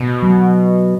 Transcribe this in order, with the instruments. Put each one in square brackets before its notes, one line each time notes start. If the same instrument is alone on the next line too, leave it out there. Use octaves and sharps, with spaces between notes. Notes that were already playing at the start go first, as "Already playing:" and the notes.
Already playing: [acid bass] B2
[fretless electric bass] F#3